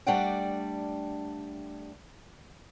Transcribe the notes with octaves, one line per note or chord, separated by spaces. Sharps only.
G3 A3 D4 D5 F#5 G5